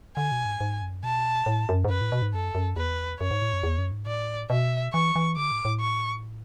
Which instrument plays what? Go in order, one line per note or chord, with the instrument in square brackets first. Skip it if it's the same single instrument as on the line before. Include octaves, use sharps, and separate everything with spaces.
[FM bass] D3 [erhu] G#5
[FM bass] B2
G#2
G#2
F#2
[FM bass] B2 [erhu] A5
[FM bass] A2
F#2
G#2
[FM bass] F#2 [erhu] B4
[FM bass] A2
B2
G#2
[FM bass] F#2 [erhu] A4
[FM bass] F#2
[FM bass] E2 [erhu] B4
[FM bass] F#2 [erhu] C#5
[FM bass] G#2
A2
F#2
E2
F#2
G#2
[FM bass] A2 [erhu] D5
[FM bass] B2 [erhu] E5
[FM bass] E3 [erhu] C#6
[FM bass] E3
[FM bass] D3 [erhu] D6
[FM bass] A2
A2
[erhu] C#6